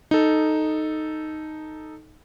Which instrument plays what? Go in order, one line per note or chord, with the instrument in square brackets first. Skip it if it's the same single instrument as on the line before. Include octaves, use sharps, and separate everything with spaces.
[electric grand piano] D#4 A4